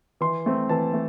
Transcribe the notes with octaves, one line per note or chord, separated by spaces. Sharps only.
E3 C6
A3 C4
E3 A5
A3